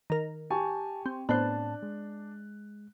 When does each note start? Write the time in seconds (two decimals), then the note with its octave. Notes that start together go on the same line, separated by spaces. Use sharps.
0.10 D#3 A#4
0.51 G4 G#5 A5 C#6
1.06 C4
1.29 A2 B3 C4 D4 C5 A5 F#6
1.82 G#3